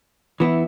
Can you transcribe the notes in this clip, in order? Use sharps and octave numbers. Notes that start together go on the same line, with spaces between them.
E3 B3 E4